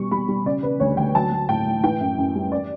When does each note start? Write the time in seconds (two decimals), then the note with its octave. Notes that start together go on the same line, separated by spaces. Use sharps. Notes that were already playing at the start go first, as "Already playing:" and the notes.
Already playing: B2 G3 C#6
0.11 G3 B5
0.28 G3
0.45 C#3 D5
0.63 C#3 B4
0.80 D2 C#5
0.97 D2 G5
1.15 F#3 A5
1.32 F#3
1.49 A2 G5
1.66 A2
1.84 E3 G5
2.01 F#2
2.18 F#2
2.35 G3
2.52 D5